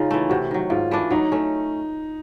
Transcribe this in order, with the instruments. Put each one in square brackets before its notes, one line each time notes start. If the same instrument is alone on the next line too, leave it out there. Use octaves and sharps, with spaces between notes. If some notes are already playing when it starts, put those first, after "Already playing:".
Already playing: [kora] C#3 [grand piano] D#4 F4
[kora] E3 A3
[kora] C3 [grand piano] F#4
[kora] D#3 F#3
[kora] G#2 [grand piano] F4
[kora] E3 A3 D4
[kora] F#3 [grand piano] D#4
[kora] A3 C#4